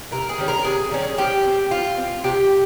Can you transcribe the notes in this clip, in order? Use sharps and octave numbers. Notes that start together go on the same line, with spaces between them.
C3 A#4
G#4
D#3 G3 C#4
A#4
C3 G#4
D#3 G3 C#4
F3 G4
C4
F3 F4
C4
C3 G4